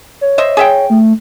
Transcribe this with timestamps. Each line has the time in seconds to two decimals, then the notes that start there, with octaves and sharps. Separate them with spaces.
0.21 C#5
0.38 C5 D#5 E5
0.57 G#4 E5 G5
0.90 A3